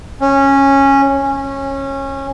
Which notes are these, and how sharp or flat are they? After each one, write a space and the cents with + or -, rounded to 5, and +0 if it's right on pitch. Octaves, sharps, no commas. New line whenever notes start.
C#4 -10
C#4 -20